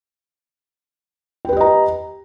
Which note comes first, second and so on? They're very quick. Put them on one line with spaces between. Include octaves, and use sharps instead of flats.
G5 B4 G4 D#5 A#5